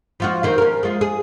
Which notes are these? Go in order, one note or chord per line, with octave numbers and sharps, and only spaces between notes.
F3 F4 F#4
D#3 C4 F#4
C#4 A#4
G#3 F4
G#4